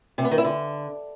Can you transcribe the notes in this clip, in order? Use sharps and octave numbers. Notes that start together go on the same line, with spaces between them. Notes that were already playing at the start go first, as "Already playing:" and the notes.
C3
B3
D#3
E4
D3